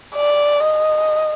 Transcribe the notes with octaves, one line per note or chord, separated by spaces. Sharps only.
D5
D#5